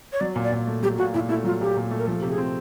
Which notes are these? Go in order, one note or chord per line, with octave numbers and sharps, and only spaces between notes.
C#5
F#3 D5
A#2
D5
A#2
A3
F#3 G4
A#2 F#4
A#2 E4
A3 E4
F#3 F4
A#2 G4
A#2
A3
A#4
F3 A4
C3 G4
G#4
C4